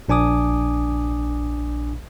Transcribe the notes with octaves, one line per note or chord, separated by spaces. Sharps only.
A#1 D4 G#5 D6 D#6